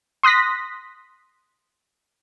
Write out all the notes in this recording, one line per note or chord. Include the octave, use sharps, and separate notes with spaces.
C6 D#6 F#6 A#6 B6